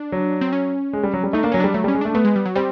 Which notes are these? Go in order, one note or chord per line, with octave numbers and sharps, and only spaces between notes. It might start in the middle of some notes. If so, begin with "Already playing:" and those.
Already playing: D4
F#3
C4
C#4
G#3
G3
F#3
G3
A3 D#4
A#3 D4
F#3 C#4
G3 D4
F#3 A3
G3
C#4
G#3
A3 D4
A3 B3
G#3
G3
F#3
G3 C4